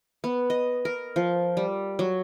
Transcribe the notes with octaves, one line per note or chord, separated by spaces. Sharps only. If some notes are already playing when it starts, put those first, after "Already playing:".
B3
D#5
A#4
F3
G3
F#3